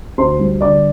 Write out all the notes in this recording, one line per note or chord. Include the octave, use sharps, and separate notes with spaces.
D2 C5 C6
G3
D3 D5 D6